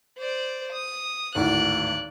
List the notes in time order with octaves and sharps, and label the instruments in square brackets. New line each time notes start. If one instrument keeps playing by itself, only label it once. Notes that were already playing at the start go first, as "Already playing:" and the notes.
[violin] C5 D5
D#6
[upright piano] G#1 D2 A2 [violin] D5 F#6